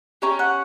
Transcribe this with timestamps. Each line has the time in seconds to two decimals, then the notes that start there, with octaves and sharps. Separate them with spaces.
0.22 C#4 G4 A#5
0.39 F#5